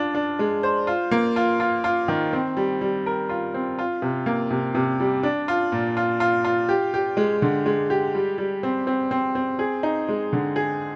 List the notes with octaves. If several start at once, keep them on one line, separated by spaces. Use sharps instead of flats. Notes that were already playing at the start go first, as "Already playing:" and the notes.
Already playing: D4 F4
D4
G#3
C5
F4
A#3
F4
F4
F4
D#3
C4
G3
G3
A#4
F4
C4
F4
C3
A#3
C3
C3
G3
D4
F4
A#2
F4
F4
F4
G4
G4
G#3
D3
G#3
G4
G3
G3
C4
C4
C4
C4
G#4
D#4
G#3
D3
G#4